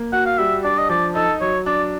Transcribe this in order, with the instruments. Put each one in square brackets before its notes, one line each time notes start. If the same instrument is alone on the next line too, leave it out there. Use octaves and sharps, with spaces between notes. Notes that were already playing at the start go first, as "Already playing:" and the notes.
Already playing: [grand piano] A#3
[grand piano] F#4 [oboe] F#5
[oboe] F5
[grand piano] G3 [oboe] E5
[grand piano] D4 [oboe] D5
[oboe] D#5
[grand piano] F3 [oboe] D5
[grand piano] D#4 [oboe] A4
[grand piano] F#3 [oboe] C#5
[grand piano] D4 [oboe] D5